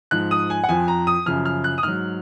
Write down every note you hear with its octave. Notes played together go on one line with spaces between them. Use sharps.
G#2 F3 F#6
D#6
G#5
F#5
F2 F3 G#5
A#5
D#6
F#2 C#3 F3 F6
F6
F#6
D#6
G#2 F#3 F6